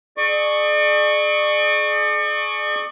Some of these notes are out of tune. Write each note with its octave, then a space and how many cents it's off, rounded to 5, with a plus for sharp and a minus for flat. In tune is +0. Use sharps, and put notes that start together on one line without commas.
G#4 +30 D5 +40 C#6 +0